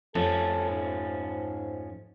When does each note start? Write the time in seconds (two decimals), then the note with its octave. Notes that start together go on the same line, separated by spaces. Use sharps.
0.15 F2 F3 A3 C#4 A4
0.70 G#2